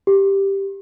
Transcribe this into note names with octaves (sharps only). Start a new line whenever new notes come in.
G4